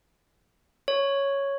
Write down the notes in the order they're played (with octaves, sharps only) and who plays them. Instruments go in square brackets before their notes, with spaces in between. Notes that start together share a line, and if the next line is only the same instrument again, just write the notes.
[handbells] C#5